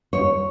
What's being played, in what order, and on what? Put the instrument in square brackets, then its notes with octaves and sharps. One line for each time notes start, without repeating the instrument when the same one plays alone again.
[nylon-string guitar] C#5